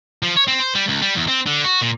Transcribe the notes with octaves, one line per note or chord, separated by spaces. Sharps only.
F3
C#5
C4
C5
G3
C#2
G3
E2
C4
D3
F#4
A#2